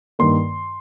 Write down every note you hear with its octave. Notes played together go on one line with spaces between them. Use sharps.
G2 D#3 A#3 C6